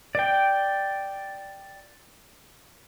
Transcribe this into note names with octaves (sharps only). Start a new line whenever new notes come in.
D5 G5